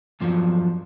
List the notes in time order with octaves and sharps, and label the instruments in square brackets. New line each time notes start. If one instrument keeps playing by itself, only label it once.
[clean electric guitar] E2 G2 F3 F#3